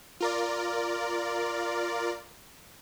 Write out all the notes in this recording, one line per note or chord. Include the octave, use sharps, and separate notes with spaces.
F4 A#4 D5